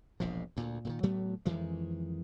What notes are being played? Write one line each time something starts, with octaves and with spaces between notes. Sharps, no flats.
E1 A#1 G#2 F3
D2 A#2
A#2 D3 D#3
A2 F#3 A3 B3
F2 D#3 E3 G#3